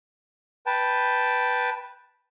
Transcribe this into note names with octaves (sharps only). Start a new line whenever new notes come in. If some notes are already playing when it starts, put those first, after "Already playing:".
B4 G5 A5